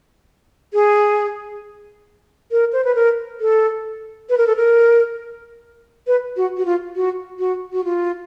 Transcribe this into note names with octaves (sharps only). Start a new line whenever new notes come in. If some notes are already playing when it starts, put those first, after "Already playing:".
G#4
A#4
C5
B4
A#4
A4
B4
A#4
A4
A#4
B4
F#4
F#4
F4
F#4
F#4
F#4
F4